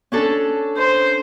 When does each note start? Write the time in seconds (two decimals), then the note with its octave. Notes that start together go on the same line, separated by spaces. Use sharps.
0.12 C#4 D4 A4
0.77 C5